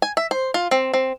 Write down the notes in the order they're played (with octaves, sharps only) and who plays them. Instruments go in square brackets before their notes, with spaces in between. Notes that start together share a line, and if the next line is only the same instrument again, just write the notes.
[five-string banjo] G#5
E5
C5
F4
C4
C4